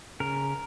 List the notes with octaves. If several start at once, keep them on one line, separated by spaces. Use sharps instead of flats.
C#3 A#4